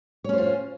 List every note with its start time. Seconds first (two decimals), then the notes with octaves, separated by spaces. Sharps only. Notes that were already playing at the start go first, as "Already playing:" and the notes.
0.24 C#5
0.29 C#4
0.33 C5
0.38 F4